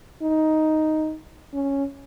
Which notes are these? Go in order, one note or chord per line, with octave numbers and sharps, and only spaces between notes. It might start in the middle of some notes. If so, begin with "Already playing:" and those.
D#4
C#4